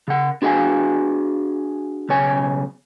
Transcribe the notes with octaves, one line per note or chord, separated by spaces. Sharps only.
C#3 F#5
D4 F#4 G#4 E5 F5 G#5
B1 C#3 C#5 G#5